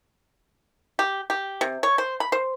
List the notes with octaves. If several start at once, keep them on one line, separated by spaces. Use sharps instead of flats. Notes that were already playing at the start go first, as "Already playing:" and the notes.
G4
G4
C3
C#5
C5
B5
C5